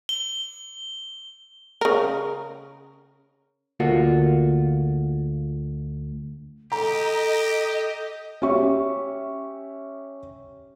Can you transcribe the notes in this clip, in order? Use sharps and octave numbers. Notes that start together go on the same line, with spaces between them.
G7
C#3 A#4
D2 A#3 F4 F#4
G4 A4 D#5 A#5
C#4 G4 E5 C#6